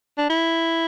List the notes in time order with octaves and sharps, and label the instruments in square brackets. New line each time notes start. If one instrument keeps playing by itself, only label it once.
[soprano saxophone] D4
E4